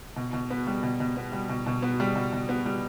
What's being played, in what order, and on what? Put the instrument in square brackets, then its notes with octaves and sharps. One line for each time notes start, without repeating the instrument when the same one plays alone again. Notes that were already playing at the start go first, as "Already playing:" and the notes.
[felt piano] B2
B2
B3
G3
B2
B2
B3
G3
B2
B2
B3
G3
B2
B2
B3
G3